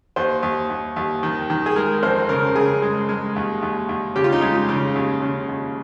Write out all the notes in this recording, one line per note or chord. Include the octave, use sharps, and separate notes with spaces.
D#2 C5
D#2
D#2
D#2
D#3
D#3
G#4
G#3 A#4
A#4
F2 C5
C#3 A#4
C#3 G#4
G#3
G#3
D#2
D#2
D#2
C#3 G4
F4
D#4
G#3 F4
C#3
D#2
C#3
D#2